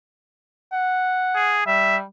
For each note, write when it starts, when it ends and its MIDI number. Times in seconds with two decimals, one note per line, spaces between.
0.73 1.61 78
1.35 1.62 68
1.67 2.03 55
1.67 1.97 76